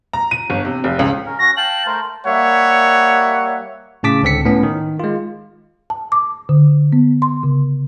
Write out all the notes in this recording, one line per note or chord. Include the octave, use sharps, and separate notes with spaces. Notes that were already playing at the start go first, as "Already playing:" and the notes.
A#5
D#7
G1
C3
F1
C#2
C#4 A#4
C#4 F#4 A#6
F5 G5 A5 F#7
A3 A#4 C5
G3 A#3 C#5 E5 F#5
A2 C#3 A5 D6 B6
C#2 D3 C4 A4 B6 C#7
A2 B3 C#4
D#3
G#3 F4
A5
D6
D3
B3
C6
C#3